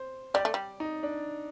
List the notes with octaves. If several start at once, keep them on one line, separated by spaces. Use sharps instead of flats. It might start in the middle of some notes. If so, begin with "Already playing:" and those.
Already playing: C5
G3 D5
A3
G3
D#4
D4